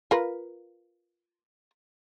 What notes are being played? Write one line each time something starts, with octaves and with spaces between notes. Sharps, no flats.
F4 A#4 B4